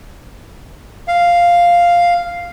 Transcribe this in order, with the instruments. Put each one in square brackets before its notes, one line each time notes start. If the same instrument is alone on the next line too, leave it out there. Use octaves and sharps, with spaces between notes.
[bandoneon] F5